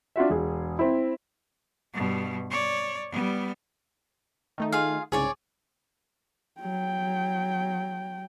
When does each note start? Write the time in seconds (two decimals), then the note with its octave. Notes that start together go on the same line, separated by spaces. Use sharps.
0.16 D4 F4 F#4 E5
0.30 E1 G#4
0.79 C4 E4
1.93 G2 B2
2.50 C#5 D5
3.11 G3 B3
4.58 D#3 A3 D#4
4.72 F4 G#4 F5
5.12 C2 G#2 C#3 G#4 C#5 D5
6.61 F#3 G5